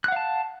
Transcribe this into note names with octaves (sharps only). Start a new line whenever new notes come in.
F5 F#5 A5 F#6